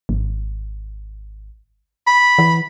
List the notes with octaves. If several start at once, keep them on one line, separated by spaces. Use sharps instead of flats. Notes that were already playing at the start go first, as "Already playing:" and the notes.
G#1
B5
E3